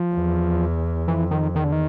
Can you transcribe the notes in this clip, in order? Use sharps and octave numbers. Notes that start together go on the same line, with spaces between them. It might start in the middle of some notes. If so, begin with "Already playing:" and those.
Already playing: F3
E2
F2 E3
D#3
E2 D#3
D3
D#3